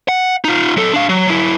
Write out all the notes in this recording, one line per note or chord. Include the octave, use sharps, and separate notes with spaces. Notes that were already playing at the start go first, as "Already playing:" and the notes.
F#5
D#4 F4
F#3 A4
D4 F5
F#3
F#3 E4